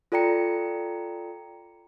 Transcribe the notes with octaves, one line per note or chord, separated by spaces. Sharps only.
F4 A4 D5 G5 A#5 C#7